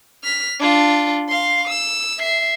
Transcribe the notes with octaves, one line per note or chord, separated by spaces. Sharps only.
F6 B6
D4 F4
F5 C6
E6
E5 C7